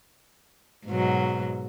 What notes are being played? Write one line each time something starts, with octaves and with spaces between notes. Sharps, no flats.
G#2 B2 F#3